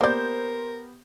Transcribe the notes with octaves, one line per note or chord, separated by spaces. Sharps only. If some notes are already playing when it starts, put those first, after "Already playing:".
A#3 B3 G4 A#4 C5 D5 G6